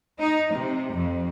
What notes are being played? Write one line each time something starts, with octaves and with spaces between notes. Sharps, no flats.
D#4
C3
F2